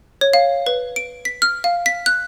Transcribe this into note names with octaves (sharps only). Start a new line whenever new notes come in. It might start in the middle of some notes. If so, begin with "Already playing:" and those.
C#5
F5
B4
D7
B6
F6
F5
B6
F#6